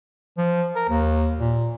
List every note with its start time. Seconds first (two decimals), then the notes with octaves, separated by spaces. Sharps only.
0.38 F3
0.76 A#4
0.89 D#2
1.40 A#2